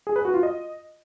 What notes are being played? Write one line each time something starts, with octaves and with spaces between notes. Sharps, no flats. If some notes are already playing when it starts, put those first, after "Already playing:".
G#4
B4
F#4
F4
D#5